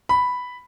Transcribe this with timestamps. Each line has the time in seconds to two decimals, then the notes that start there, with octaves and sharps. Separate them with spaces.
0.09 B5